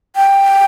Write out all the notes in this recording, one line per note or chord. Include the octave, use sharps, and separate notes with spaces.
G5